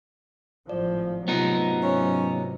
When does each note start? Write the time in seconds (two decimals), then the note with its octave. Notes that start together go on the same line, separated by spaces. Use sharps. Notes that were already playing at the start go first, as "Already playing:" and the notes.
0.69 G#1 A2 F3 D5
1.28 G#2 C3 F#3 A3 B3 D#4 F4 A#6
1.83 C#4